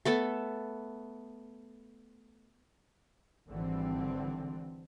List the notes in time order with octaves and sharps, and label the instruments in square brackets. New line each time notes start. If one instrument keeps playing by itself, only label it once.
[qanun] A3 B3 A4
[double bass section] G#1 D3 E3 G3 C4